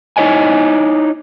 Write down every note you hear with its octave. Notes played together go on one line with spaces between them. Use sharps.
D#4 E4 C#5 D#5 G#5